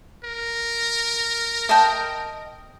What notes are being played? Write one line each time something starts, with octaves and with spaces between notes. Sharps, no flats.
A#4
D#5 E5 G5 A5